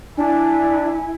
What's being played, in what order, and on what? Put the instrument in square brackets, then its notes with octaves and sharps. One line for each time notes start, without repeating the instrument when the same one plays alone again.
[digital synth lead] D4 [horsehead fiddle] E4 [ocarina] G#5